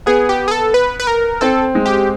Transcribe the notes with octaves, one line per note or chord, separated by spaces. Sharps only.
B3 G#4
G4
G#4
A4
B4
B4
A#4
C4 A4
G#3
G4